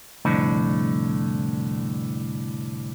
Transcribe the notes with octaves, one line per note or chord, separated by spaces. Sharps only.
C2 F2 A2 D3